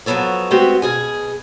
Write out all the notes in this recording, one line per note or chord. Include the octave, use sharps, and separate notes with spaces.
F3 F#3 G#3 B3 A4 C#5
G#3 A3 B3 C4 F#4 G4
B2 G#4 G#5